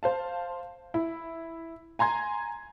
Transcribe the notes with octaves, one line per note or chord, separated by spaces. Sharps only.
C5 F5 A5
E4
G#5 A#5 C6 G#6